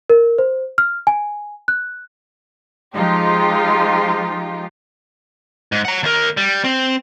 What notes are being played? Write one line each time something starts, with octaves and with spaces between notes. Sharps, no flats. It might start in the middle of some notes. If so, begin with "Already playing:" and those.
A#4
C5
F6
G#5
F#6
F3 G#3 D#4 F4 G4
G#2
F#5 A#5
D#2 A#4
G3
C4